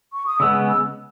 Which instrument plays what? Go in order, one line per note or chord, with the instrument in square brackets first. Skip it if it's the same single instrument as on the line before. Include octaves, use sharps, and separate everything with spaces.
[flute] C#6
D#6
[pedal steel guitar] C#3 G#3 B3 [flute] E6
[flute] E6